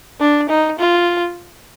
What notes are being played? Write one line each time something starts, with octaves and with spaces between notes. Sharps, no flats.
D4
D#4
F4